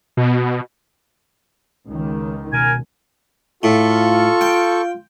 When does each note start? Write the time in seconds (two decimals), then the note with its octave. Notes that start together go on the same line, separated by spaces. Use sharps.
0.17 B2
1.86 C#2 D#3
2.52 B2 A#4 G#5
3.63 A2 F4 A4 C#6
4.41 G5